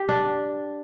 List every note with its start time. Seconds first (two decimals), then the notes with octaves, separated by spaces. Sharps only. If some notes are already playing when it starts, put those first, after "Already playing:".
Already playing: G4
0.09 D4